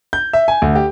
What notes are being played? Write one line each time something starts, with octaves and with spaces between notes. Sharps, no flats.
G6
E5
G#5
D2
G4